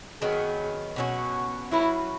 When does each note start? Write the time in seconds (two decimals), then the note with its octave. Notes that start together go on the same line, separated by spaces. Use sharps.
0.22 D#3 F#3 B3 G#4
0.96 B2 F#3 C#4 F#4
1.71 F#3 C#4 E4 F#4 B4